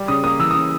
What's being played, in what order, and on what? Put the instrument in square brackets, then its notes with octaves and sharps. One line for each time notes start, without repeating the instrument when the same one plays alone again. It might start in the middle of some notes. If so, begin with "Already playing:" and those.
Already playing: [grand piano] G3
C#3 D#6
A#3 D#6
E3 E6
D#6
C#3